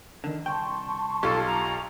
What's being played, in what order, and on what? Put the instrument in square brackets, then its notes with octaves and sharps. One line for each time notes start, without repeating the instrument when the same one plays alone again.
[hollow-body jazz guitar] D3 D#3 [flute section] A#4
[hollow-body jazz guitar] C2 G5 [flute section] A5 C6 C#6
[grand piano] B1 F4 [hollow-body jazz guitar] G4 [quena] A4
[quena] A#5